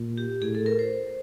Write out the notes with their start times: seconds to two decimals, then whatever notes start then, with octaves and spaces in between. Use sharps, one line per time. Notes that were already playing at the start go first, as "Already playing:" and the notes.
Already playing: A#2
0.18 G4
0.42 A2 G#4
0.55 A4
0.66 A#4
0.79 C5